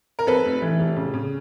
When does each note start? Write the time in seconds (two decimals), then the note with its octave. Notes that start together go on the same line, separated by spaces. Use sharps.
0.19 A#4
0.27 F2 A4 B4
0.45 F1
0.62 E3
0.79 F1
0.96 C#3
1.14 C#3